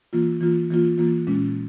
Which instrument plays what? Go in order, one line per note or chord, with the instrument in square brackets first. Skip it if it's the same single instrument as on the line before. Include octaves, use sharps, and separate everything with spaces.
[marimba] E3 A#3 F4
E3 A#3 F4
E3 A#3 F4
E3 A#3 F4
A#2 G#3 C#4